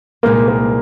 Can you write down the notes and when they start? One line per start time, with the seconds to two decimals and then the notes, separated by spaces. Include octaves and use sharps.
0.23 C2 A#2 G#3 A#3 D#4
0.48 A#3